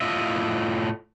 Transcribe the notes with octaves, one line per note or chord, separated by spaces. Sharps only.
A2 F4 D#5 E5